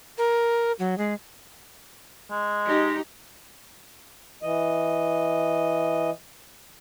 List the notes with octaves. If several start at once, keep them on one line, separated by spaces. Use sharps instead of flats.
A#4
F#3
G#3
G#3
D#4 G4
E3 D#5